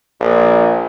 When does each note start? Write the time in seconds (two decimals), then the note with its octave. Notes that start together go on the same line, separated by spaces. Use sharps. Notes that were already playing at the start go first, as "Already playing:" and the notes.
0.20 A#1